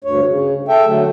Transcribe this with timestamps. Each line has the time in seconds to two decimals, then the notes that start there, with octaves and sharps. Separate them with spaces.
0.04 D2 G2 C#5
0.27 C#3
0.68 A4 E5 G5
0.86 D3 F#3 A3